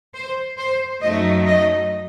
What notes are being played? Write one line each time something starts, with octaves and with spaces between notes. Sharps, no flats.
C5
C5
F#2 F#3 A3 D#4 D#5
D#5